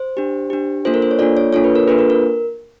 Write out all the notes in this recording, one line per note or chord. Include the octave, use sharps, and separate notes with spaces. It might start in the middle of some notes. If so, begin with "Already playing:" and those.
Already playing: C5
D4 G4
D4 G4
A#3 D4 F4 A4 C5
A#4
C5
C#5
A#3 D4 F4 A4 D5
C#5
A#3 D4 F4 A4 C#5
B4
A#4
A#3 D4 F4 A4 B4
A#4
A#4